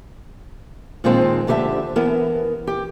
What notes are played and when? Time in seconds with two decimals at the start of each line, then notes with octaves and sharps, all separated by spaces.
1.04 A#2 D#3 F3 G#3 C4
1.47 D2 D3 G4 C5 E5 A5
1.96 E3 B3 A#4
2.67 G4